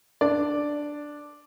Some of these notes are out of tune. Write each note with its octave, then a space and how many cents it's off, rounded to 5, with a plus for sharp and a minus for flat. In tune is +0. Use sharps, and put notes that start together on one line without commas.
D4 +0 D5 +0